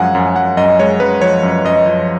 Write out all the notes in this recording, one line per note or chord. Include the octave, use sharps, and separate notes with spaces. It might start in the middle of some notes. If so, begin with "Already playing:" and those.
Already playing: F#2 F3 G#3 F5 F#5 G#5
F#2
F#2 F#5
F#2 D#5
G#3 C#5
F#2 B4
F3 C#5
F#2
F#2 D#5
F3